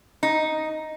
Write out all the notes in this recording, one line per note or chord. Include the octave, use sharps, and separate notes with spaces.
D#4